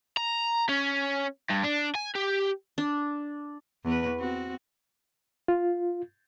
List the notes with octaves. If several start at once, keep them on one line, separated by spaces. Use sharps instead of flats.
A#5
C#4
G2
D4
G#5
G4
D4
E2 B4
C4 F#4
F4